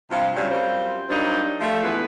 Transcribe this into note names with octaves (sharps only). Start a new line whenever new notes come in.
G2 C3 F3 F4
A2 C#3 F#3 G3
F#2 G3 C4 F4 C5
F#3 G3 A#3 C4 D4 D#4
F3 G3 A3
D2 E3 G#3 A3 B3 B4